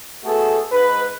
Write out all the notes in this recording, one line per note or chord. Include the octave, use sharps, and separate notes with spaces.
A3 B3 F#4 G#4 A4
G#2 B4